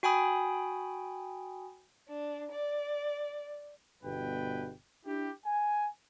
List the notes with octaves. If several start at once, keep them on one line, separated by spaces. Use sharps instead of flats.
F#4 G5 G#5 B5 D#6
D4
D5
G1 G2 B2 B4 G5
D4 E4 G4
G#5